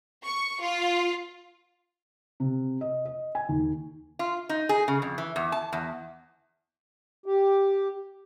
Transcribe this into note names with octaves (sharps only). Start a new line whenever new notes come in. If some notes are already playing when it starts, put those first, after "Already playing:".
C#6
F4
C3
D#5
D#5
G#5
D#2
F4
D#4
G#4
C#3
F2
E3
E2
A5
E2
G4